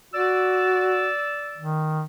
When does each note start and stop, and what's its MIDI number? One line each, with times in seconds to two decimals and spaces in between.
0.14 1.10 66
0.14 1.79 74
0.14 1.79 88
1.58 2.04 51